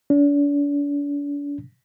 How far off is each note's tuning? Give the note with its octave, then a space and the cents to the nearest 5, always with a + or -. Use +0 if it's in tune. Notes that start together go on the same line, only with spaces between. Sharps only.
D4 -40